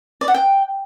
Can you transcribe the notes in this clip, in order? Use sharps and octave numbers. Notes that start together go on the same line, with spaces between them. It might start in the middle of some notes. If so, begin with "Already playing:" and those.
D5
F#5
G5